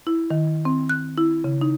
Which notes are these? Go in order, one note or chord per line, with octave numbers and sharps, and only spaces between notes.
E4
D#3
C4
F#6
E4
C#3
D#4